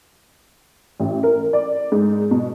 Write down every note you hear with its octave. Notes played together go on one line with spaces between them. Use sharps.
A1
A#4
D5
G#2
B2